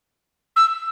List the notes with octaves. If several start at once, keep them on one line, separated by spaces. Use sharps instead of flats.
E6